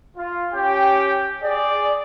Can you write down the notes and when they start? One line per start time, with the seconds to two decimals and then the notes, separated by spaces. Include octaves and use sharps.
0.17 F4
0.52 C#4 G4 G5
1.42 G#4 D5